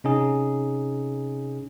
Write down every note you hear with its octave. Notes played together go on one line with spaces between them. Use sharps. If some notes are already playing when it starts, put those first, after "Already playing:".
C3 C#4 D#4 G#4